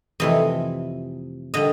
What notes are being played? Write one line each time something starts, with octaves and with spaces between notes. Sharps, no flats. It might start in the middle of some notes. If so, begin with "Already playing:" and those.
F2 C3 E3 A3 D#5
D3 G3 D#5